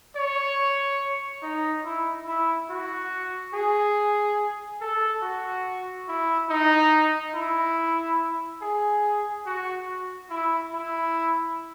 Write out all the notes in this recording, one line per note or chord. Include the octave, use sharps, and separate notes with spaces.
C#5
D#4
E4
E4
F#4
G#4
A4
F#4
E4
D#4
E4
G#4
F#4
E4
E4